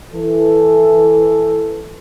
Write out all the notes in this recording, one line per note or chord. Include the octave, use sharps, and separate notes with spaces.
E3 A4